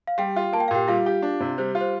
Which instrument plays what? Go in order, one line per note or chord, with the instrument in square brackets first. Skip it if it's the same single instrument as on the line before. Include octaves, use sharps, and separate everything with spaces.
[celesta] F5
[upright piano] G3 [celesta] G4 G5
[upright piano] F4
[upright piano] A#3 [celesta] A5
[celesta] G5
F5
[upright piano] A#2 [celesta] G4 G5
[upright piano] G3 [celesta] F4 F5
[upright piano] G4
D4
C3
[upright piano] G3 [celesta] C5
[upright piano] F4
[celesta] C5